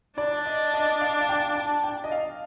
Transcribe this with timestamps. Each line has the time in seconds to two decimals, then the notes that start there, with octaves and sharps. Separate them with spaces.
0.18 D4 D5
0.46 D#5
0.74 D#5
1.01 F5
1.21 F5
1.29 G5
1.56 A5
1.84 G5
2.04 D#5
2.12 F5